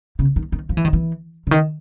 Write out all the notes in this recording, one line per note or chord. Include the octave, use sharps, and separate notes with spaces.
C#3
D#3
D#3
F3
E3
D#3
E3
D3
D#3